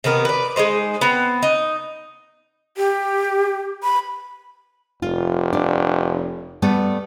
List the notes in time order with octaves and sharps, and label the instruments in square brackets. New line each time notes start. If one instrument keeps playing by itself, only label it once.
[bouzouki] C3 D#3 B3 A#4
B4 D5
G#3 C#4 D#4 C5
B3 C4
D#4
[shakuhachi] G4
B5
[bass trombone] F1 [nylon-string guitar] F4
[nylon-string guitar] D4
G3 A3 B3